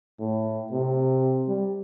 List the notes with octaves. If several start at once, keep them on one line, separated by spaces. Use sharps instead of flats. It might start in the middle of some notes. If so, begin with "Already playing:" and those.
A2
C3
G3